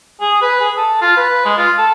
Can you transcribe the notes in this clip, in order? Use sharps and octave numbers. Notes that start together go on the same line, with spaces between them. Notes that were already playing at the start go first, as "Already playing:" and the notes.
G#4
B4
G#4
A4
F4
B4
G#3
F4
A4